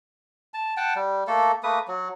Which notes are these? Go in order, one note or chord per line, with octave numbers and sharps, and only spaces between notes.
A5
F#5 G5 A5
G3
A3 A#3 A4
A3 A#3 B4 D#6
F#3